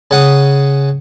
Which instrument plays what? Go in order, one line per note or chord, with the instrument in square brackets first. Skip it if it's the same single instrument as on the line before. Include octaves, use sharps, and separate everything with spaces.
[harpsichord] C#3 F#5 D#6